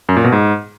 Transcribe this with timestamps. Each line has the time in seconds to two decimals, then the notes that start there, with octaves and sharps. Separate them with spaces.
0.09 F#2
0.17 A#2
0.24 B2
0.32 G#2